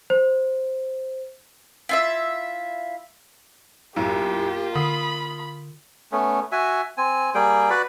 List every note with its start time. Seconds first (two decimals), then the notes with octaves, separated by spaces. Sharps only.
0.10 C5
1.89 E4 F4 E5
3.96 B1 F#2 A#3 E4 F4 G4
4.76 D3 B5 D#6 C7
6.12 A3 B3 C#4
6.52 F#4 E5 G#5
6.98 C4 G#5
7.35 G3 A#3 G#4 G5
7.70 F#4 B4 D5 B5